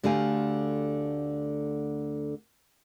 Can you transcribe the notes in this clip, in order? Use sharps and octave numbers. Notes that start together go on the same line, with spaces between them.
D2 D3 A3 G4 F5 G#5